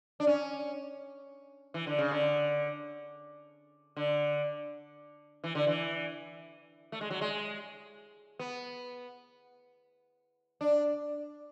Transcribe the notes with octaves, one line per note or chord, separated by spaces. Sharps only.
D4
C#4
E3
D3
C#3
D3
D3
E3
D3
E3
A3
G#3
F#3
G#3
B3
D4